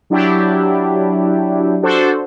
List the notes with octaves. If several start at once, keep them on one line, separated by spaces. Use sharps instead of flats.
F#3 D4 E4 G4
D4 F#4 A4 C5